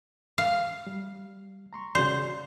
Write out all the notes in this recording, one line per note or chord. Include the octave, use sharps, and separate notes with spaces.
F5
G3
A#5 C6 C#6
C#3 F#4 C5 D5